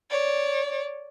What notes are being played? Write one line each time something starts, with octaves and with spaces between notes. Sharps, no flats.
C#5 D5